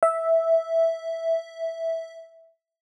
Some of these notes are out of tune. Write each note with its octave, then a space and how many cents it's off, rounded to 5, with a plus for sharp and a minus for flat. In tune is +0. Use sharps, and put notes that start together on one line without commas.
E5 -5